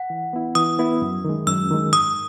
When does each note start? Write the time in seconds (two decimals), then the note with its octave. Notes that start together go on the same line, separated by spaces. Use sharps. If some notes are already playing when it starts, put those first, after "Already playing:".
Already playing: F#5
0.10 E3
0.33 B3 E4
0.55 E3 D#6
0.79 B3 E4
1.02 F#2
1.25 D#3 G#3
1.47 F#2 E6
1.71 D#3 G#3
1.93 G#2 D#6